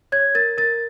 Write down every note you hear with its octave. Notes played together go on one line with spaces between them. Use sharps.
C#5 G#6
A#4 A6
A#4 A6